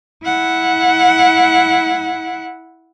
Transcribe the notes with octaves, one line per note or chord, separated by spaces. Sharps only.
E4 F#5